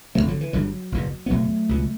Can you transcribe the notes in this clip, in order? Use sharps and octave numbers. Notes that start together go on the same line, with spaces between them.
G1 G2 D3 F#3 A3
D3 F#3
E3
G1 G2 D3 F#3
F#1 E2 B2
B3
F#1 E2 B2 F#3 A3
C#2 B2